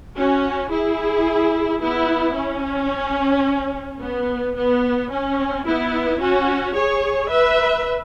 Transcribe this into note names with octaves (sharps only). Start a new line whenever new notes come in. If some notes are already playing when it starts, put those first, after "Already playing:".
C#4 F#4
E4 G#4
B3 E4
C#4
B3
B3
C#4
B3 E4
C#4 F#4
G#4 C#5
B4 E5